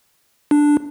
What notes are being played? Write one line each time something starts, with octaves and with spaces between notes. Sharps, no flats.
D4